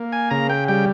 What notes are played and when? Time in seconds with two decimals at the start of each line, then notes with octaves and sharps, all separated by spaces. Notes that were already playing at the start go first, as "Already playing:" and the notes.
Already playing: A#3
0.13 G#5
0.30 C#3 A#5
0.50 G5
0.68 G3 G5